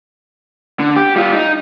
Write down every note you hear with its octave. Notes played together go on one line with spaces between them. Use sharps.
D3
G4
G3 F4
D#4